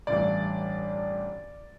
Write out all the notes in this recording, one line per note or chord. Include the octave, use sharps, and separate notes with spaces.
A1 G2 E3 D5